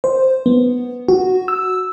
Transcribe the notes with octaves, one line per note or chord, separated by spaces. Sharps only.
C5
B3
F#4
E6